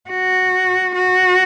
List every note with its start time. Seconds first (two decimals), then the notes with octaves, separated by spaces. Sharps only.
0.10 F#4
0.95 F#4